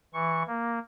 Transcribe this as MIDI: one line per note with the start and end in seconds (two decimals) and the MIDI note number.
0.14 0.43 52
0.14 0.43 85
0.48 0.79 58